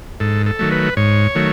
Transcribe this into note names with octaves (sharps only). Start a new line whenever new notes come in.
G#2 A4
A4
D#3 F#3 A3
B4
G#2 C#5
D#3 F#3 A3